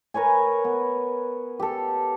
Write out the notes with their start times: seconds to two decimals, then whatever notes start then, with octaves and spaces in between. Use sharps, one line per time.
0.14 A#4 B4 C#5 G#5
0.64 B3
1.60 G4 A4